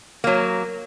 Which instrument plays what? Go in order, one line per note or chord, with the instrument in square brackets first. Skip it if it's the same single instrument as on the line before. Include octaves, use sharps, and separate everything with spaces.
[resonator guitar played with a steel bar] F#3 A#3